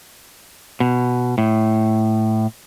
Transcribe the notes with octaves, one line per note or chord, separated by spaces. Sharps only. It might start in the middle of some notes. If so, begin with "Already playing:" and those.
B2
A2